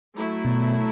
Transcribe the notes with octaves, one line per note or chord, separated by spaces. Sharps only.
F#3 A3 E4
B2